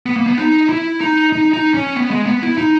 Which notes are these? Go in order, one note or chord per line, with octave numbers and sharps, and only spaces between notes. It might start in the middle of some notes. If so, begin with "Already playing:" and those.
B3
A#3
B3
D#4
E4
D#4
D#4
D#4
C#4
B3
G#3
B3
E4
D#4